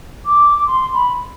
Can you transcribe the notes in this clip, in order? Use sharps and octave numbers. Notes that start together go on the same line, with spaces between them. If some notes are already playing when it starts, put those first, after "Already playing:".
D6
D6
C6
B5